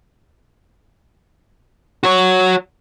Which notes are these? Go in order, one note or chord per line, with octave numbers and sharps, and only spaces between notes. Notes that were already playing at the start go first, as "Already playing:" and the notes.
F#4 C#5